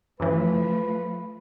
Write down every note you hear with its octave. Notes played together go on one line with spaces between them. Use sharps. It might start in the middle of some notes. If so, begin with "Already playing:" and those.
F#2 C#3 E3 F3 A3 B4